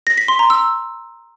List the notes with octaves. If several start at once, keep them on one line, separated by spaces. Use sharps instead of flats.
A#6
B6
C6
A#5
E6